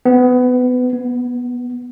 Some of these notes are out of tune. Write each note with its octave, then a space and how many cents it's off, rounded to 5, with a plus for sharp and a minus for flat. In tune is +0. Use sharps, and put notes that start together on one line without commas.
B3 +20
B3 -15